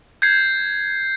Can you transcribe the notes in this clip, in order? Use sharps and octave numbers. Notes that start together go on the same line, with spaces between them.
G6 G#6 C7